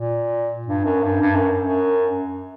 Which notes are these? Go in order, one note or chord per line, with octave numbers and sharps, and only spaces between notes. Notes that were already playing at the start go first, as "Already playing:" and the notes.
Already playing: A#2
G2
F#2
G2
G2
F#2
F#2